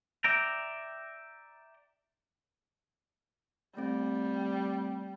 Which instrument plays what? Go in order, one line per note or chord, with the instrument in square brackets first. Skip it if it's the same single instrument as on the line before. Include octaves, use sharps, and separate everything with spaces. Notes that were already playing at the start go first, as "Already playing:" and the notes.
[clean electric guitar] D5 E5 G5 A#5
[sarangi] G3 [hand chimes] A3 C4